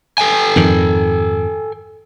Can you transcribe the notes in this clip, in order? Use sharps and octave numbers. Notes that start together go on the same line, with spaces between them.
A4 G5 G#5
F2 G#2 D#3